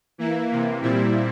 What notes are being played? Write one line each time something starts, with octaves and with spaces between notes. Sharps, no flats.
E3 A#3 E4
C3 E3 A#3
A#2 G3 C4 E4